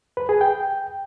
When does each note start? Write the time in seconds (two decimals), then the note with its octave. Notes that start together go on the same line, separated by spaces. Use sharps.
0.17 B4
0.29 G#4
0.41 G5